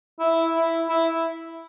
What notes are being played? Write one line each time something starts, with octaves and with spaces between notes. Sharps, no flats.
E4
E4
E4